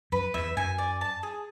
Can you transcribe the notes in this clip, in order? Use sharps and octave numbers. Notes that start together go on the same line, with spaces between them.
F#2 B4
E2 E5
F#2 G#5
D5
A5
G#4